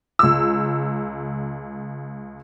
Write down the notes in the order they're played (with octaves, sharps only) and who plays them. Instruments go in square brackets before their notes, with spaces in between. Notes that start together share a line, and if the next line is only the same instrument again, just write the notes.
[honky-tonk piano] C#2 E6